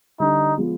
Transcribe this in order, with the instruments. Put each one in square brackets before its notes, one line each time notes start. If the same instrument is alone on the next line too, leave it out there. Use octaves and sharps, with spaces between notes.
[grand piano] D3 G3 D4 [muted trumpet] D#4
[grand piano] F3 G#3 B3